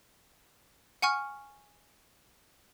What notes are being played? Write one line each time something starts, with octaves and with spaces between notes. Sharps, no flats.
F#5 G#5 C#6 F6